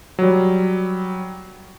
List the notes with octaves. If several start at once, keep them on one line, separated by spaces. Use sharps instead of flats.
F#3 G3